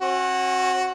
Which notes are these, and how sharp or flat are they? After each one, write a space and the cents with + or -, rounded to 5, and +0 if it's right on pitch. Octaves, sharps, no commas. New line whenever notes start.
C#4 -40 F#4 +0